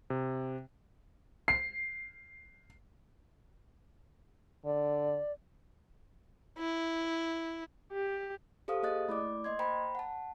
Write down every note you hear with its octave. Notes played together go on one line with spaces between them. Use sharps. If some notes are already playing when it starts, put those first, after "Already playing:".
C3
C7
D3 D5
E4
G4
G4 A4 C5 F5 D#6
A#3 G#4 D#5 D#6 F#6 A6
A3 E4 D5 D6
A#3 D#5 C6 G#6
C5 G5 A#5 B5
F#5 A5